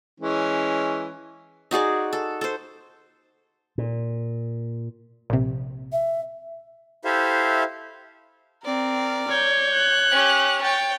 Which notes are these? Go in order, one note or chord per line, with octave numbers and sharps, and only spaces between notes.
E3 G#3 C#4
D#4 F#4 G#4 D5
A4
A4 C5
A#2
A#1 C3
E5
E4 G4 A4 C5 E5 F5
C4 A#4 D5
C#5 G6
F#6
C#4 G4
C#5 G5 A6